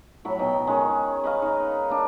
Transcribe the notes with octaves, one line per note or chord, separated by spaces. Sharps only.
A2 F#3 B5
B2 D#4 G5
D#3 G#3 C#4
B4 D#5 F5
D#4
A#3 D4